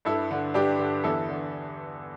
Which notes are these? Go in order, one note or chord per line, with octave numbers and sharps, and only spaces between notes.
G2 E4 A4
D3
G2 D4 G4
D3
E2 E4 A4
D3